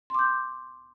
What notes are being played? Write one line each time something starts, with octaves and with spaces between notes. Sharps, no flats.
C6 D6 G6